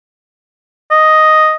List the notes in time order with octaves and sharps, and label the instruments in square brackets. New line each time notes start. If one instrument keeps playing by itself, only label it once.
[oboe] D#5